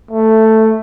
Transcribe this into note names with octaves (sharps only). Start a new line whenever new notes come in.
A3